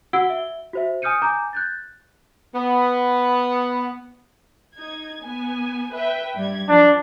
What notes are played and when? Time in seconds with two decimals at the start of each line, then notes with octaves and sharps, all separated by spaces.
0.13 F#4 F#5 E6 G#6 D7 G7
0.30 E5 G7
0.73 F#4 C5 E5
1.02 G#5 D#6 F6 G6 C#7 D#7
1.22 G#5 A#5 D6 G6
1.53 F#6 G6 A6
2.55 B3
4.76 D#4 G#6
5.21 B3 G#5
5.92 B4 E5 G5
6.35 G2 G3 G#6
6.69 F3 D4